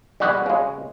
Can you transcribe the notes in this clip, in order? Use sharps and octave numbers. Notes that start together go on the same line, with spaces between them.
G3 G#3 F#4 B4
C#3 G#3